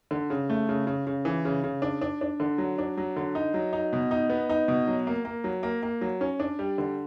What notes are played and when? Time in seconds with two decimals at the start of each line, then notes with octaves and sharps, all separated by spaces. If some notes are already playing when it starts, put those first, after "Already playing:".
0.11 D3
0.30 C#3
0.49 A3
0.69 C#3
0.87 C#3
1.07 C#3
1.25 E3
1.45 C#3
1.64 C#3
1.82 D4
2.01 D4
2.21 D4
2.40 D3
2.58 F#3
2.78 D4
2.97 F#3
3.16 D3
3.35 D#4
3.54 F#3
3.73 D#4
3.93 B2
4.11 D#4
4.30 B3
4.49 D#4
4.68 B2
4.87 F#3
5.07 A#3
5.25 A#3
5.44 F#3
5.63 A#3
5.83 A#3
6.01 F#3
6.21 C#4
6.40 D4
6.59 G3
6.78 D3